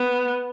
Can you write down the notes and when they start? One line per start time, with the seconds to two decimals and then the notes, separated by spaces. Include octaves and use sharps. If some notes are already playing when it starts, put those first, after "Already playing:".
Already playing: B3